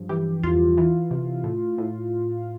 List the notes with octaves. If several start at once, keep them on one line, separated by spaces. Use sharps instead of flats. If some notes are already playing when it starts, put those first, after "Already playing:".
Already playing: G2 F3
E3 G4
E2 F4
E3
C3
A2
A2